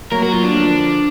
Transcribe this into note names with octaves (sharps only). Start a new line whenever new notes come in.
F#3 A#3 A#4
F#4
F4
D4
D3 F3